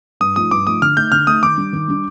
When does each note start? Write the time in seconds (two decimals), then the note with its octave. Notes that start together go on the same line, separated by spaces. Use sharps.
0.21 G2 D#6
0.36 F3 A3 D#4 D#6
0.51 G2 D6
0.67 F3 A3 D#4 D#6
0.82 D3 F6
0.97 A3 D#4 G6
1.12 D3 F6
1.27 A3 D#4 D#6
1.43 D#3 D6
1.57 G3 D4
1.73 D#3
1.88 G3 D4